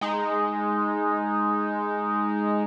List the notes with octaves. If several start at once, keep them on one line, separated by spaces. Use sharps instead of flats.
G#3 D#4